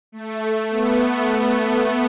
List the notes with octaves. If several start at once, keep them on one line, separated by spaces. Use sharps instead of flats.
A3
B3
A3